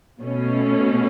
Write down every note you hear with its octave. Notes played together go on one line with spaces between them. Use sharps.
B2 A3 C#4